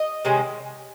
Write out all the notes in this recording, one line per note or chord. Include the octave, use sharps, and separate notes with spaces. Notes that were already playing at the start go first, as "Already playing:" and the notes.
Already playing: D#5
C3 D#3 G#3 C#4